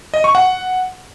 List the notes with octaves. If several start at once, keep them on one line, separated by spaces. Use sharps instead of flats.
D#5
C#6
F#5